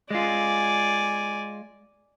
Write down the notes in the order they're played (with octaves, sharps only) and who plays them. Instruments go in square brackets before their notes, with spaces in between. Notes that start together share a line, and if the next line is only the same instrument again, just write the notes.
[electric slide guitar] G#3 F4 [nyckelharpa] D5 G#5